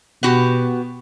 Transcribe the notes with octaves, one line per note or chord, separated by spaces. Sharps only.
B2 B3 F#4 G4